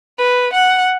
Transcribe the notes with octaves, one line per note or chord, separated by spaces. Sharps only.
B4
F#5